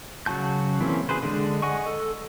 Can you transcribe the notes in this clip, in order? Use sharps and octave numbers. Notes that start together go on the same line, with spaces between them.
C#3 F#3 F#4 A5 G6
E3 A#3 C4 C#4
G#4 B4 C5
D3 G#3 D4
D#5 F#5 G#5 C#6
A4